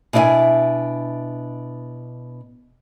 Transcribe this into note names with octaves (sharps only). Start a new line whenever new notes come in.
B2 D4 E4 D5 E5 G#5